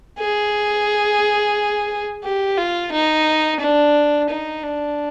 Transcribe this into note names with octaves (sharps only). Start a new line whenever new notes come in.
G#4
G4
F4
D#4
D4
D#4
D4